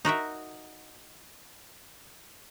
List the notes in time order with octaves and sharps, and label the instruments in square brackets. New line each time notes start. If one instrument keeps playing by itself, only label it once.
[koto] D#4 F#4 A#4 E5